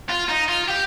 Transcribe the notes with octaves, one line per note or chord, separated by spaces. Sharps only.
F4
D#4
F4
G4